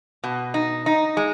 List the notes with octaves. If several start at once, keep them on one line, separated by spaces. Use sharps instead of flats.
B2
D#4
D#4
G#3